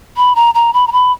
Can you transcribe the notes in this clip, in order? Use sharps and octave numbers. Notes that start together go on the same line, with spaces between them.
B5
A#5
A#5
B5
A#5
B5